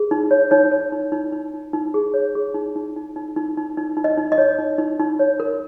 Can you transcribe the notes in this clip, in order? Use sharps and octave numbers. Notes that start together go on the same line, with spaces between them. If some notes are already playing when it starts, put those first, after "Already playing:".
Already playing: G#4
D#4
C#5
D#4 C#5
C#5
D#4
D#4
D#4
D#4
D#4
G#4
C#5
G#4
D#4
D#4
D#4
D#4
D#4
D#4
D#4
D#4
D#5
D#4
D#5
C#5
D#4
D#4
D#4
C#5
A#4